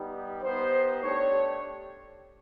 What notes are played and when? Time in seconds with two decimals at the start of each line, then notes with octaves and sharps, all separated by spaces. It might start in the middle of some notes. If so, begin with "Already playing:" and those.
Already playing: G3 B3 D#4 G4
0.43 B3 D#4 G4 C5
1.02 A3 D4 G4 C#5